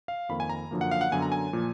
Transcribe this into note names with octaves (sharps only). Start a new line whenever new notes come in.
F5
F2 D#3 A#3 B5
G#5
A#5
F#2 D3 F3 A#3
F#5
F5
F#5
F#2 D3 F#3 B3 G#5
A#5
G#5
A#2 F3 A#3